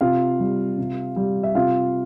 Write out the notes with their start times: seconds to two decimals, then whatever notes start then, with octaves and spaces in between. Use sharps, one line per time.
0.01 C3 F4 F5
0.40 G3
0.78 C3
1.16 G3
1.43 E5
1.55 C3 F4 F5